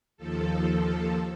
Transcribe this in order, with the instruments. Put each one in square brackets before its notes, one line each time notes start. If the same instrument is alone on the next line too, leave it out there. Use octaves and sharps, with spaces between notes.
[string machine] D#2 F3 A4